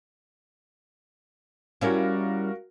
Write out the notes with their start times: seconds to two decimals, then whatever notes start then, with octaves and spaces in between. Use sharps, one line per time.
1.81 G3 C#4 E4 F#4 A#4 F5